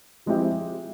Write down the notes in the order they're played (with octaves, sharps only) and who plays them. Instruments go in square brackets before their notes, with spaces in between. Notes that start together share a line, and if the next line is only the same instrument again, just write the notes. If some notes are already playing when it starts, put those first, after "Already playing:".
[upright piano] F3 G#3 C4 E4 G4